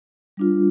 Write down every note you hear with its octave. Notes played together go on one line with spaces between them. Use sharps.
G3 D4 F4